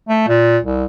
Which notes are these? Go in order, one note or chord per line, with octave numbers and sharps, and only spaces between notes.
A3
A#2
C2